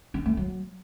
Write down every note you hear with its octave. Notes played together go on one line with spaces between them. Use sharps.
D4
A3
F#3